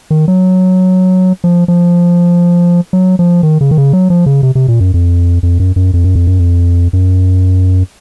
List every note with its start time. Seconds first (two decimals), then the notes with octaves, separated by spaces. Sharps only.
0.11 D#3
0.28 F#3
1.44 F3
1.68 F3
2.93 F#3
3.19 F3
3.43 D#3
3.61 C#3
3.71 D#3
3.77 C#3
3.93 F#3
4.10 F3
4.26 C#3
4.43 C3
4.55 C3
4.68 A#2
4.80 F#2
4.94 F2
5.43 F2
5.60 F#2
5.76 F#2
5.94 F2
6.04 F#2
6.15 F2
6.27 F#2
6.39 F2
6.93 F#2